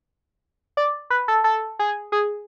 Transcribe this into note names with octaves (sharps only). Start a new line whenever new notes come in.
D5
B4
A4
A4
G#4
G#4